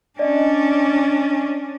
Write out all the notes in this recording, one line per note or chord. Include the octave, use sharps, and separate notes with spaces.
C#4 D4 D5 D#5